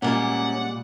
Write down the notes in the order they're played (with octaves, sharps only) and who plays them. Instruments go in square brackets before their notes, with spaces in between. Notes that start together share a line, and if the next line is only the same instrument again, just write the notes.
[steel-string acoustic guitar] A#2 G3 G#3 [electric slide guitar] C#4 A#4 [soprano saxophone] F#5